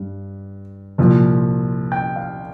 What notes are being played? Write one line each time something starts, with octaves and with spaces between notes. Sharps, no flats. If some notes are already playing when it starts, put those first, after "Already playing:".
Already playing: G2
C2 A#2 F3
G5
F5